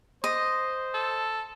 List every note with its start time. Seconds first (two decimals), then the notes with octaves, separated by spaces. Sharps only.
0.24 C5 D#5
0.94 A4